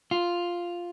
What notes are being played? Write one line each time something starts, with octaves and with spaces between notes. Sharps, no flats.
F4